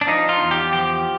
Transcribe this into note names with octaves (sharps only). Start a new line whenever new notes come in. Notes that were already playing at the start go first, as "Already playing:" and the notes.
D4
F3 D#4
F4
E2
G4
F3 G4